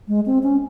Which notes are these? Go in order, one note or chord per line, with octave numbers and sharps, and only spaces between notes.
G#3
C4
C#4